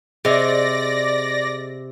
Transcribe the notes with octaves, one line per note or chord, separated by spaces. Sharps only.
C3 G#4 D5 D#5 A#6